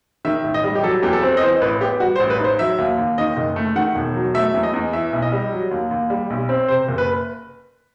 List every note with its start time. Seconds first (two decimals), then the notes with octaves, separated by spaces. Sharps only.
0.25 D#3 E5
0.44 A1
0.54 D#5
0.64 G3
0.75 G4
0.83 F#3 A4
1.03 E2 G4
1.13 A4
1.23 C4
1.37 D#5
1.42 E3 C5
1.61 A1 B4
1.81 B3 G4
2.00 G3 F#4
2.16 C5
2.20 A1
2.30 B4
2.39 D#4 C5
2.59 F#3 E5
2.78 D#2
2.98 D#2
3.18 D#3 D#5
3.37 F#1
3.56 A3
3.76 D#3 F#5
3.95 E1
4.15 F#3
4.34 A3 E5
4.54 E2
4.63 D#5
4.74 E2
4.93 E3 E5
5.13 B1
5.22 D#5
5.32 G3
5.52 F#3
5.71 D#2
5.91 D#2
6.10 G3
6.30 B1
6.49 C4
6.68 C3 C5
6.89 F#1
6.98 B4